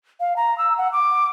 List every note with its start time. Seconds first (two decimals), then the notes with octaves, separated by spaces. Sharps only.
0.20 F5
0.36 A#5
0.58 E6
0.78 F#5
0.93 D6